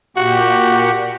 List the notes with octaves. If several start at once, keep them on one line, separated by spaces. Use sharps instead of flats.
A#2 F#4 G4